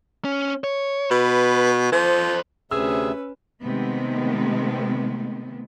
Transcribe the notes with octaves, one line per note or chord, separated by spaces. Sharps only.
C#4
C#5
B2 B4
F3 A4 C5
D2 C3 C#4 G#4 B4 E5 E6
C3 D#3 G#3 A3 B3